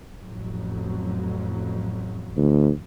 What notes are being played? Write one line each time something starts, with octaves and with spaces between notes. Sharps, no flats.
A1 F2 F#3
D2